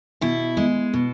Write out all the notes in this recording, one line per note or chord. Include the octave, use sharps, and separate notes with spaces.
B2 E4
G#3
B2